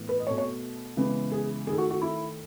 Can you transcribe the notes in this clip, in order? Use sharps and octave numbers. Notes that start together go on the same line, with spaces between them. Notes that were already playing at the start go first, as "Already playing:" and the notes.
Already playing: A2 E3 B3
B4
D#5
B2 A3 C#5
C#5
C#3 E3 G#3 B3
G#4
D#3 A3 G#4
F#4
F#4
E4